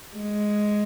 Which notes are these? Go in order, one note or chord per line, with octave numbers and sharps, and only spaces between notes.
G#3